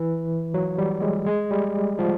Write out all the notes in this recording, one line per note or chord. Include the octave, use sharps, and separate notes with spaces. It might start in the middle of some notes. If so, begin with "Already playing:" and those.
Already playing: E3
F#3
G3
G#3
G#3
G3
F3